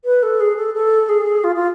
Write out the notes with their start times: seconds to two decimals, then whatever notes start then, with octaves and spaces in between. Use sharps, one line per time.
0.05 B4
0.23 A4
0.40 G#4
0.56 A4
0.74 A4
1.09 G#4
1.44 F4
1.55 F4